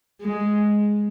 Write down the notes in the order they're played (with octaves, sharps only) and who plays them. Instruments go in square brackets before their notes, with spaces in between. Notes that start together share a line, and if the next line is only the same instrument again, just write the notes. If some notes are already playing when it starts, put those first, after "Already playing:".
[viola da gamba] G#3